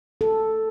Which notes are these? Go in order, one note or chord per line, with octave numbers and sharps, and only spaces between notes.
A4